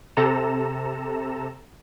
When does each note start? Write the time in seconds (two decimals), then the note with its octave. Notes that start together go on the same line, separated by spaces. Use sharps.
0.17 C3 A4 A#5 E7